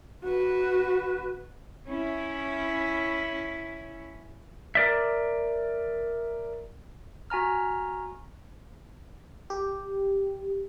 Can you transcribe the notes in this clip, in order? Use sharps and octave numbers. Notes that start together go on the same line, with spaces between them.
F#4 B4
C#4 E4
A#4 D5 E5
F#4 G#5 A#5 F6
G4